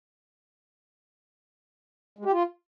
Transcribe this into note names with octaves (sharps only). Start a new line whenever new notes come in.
G#3
G4
F4